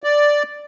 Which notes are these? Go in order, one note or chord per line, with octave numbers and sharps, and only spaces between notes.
D5